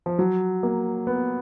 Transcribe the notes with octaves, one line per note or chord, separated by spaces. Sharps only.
F3
F#3
A#3
B3